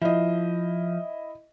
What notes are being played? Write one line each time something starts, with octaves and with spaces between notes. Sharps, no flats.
F3 E4 D#5